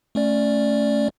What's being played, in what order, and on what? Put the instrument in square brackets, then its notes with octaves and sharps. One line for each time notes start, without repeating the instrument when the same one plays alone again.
[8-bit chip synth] A3 C#4 D5